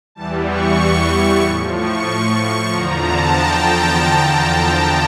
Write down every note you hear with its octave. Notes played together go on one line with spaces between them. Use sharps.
E2 E3 G3 A5
C#6
A2 F3
C#6
C#6
E2 D3 F3 A#5
A5
G5